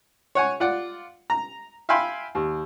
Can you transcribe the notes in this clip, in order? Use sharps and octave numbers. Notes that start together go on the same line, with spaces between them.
C#5 F#5 G#5
F4 D5 F#5
A#5
E5 F5 G5 G#5 B5 C6
D#2